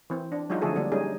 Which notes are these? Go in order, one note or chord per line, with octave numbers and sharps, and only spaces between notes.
E3 C4
D4
F#3 G#3 D#4 F4 F#4
D3 F3 A3 G#4 A4
D3 G3 A#3 D4
G3 G#3 C#4 D#4 G#4